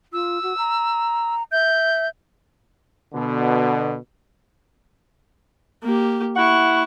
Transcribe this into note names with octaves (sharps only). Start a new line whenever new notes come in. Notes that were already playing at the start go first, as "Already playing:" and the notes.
F4 E6
F#4
A#5
E5 G6
B2 D3
A#3 G4
E4 F#5 C#6